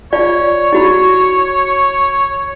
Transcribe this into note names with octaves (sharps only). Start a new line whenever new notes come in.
F4 C#5 D5
E4 F#4 B5